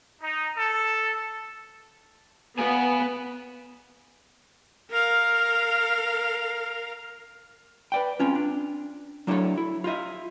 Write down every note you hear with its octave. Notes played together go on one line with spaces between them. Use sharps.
D#4
A4
B3 F5 G#5
A#4 F5
B4 D5 G5
C4 C#4 F4
D4
F#3 D4 E4 G4 A4 C#5
E4
F4 G4 D#5 E5